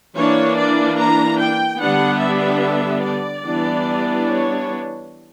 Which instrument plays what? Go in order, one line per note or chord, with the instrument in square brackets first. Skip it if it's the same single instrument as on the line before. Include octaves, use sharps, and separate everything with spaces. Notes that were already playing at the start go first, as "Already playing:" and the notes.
[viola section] E3 A#3 D4 C#5
D5
A#5
G5
D3 G3 B3 D4 F#5
E5
D5
E3 G3 B3 D4
C#5